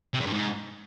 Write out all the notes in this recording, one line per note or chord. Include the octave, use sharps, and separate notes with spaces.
C3
E2
G2
G#2